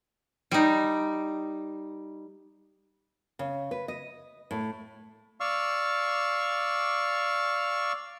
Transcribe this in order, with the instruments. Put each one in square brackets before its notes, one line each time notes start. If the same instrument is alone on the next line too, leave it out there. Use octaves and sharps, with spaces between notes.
[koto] G3 D#4
[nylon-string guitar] C#3
B4
D#5
A2
[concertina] D5 F5 C#6 E6